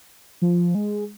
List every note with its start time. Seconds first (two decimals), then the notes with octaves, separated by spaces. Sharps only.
0.42 F3
0.75 G#3